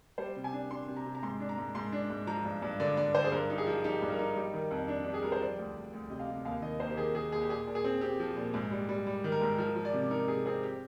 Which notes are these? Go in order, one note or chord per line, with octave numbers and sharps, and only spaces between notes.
G3 C5
C3
G#5
D4
D4 C6
C3
A#5
C3
A#5
G#2 C6
D4
A#5
G#2
G#2 C6
D4
G#2
F3 A#5
G2
G2
D3 D5
G2 D5
D3 C5
G#4
G2 A#4
D#4 G4
G#4
F3
D#4 G4
G2
A#4
D#4
G3
D#3
F2
D4
D4 G4
G#4
G3 A#4
C5
F3 D5
D2
D2
D2
C3 D#5
F5
C3
D#2 F5
D#3 D#5
A#3 C5
G4
D#3 G#4
D#3 G#4
D#2 G#4
G4
A#2 G#4
A#2
G#4
C4
C4 G4
F3
A#2
G#2
G3
G3
G3
D#3
A#4
G#2
F3 A#4
F3
D5
C3
D#4 A#4
C3 G#4
C4 G#4
G4